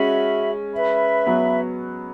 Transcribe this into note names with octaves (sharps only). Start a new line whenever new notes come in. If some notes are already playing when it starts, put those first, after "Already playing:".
Already playing: G#3 C#4 F#4 E5 B5
B4 E5 B5
F#3 B3